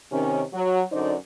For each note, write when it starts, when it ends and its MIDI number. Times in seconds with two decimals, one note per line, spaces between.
0.12 0.43 48
0.12 0.43 51
0.12 0.43 61
0.53 0.82 54
0.92 1.14 42
0.92 1.14 50
0.92 1.14 63
0.92 1.14 72
0.92 1.14 74